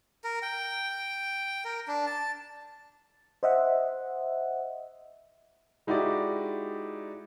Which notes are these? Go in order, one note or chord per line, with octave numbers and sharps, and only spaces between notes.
A#4
G5
A#4
D4
A5
C5 D#5 E5 F#5
G#3 D#4 E4 F#4 G4 D5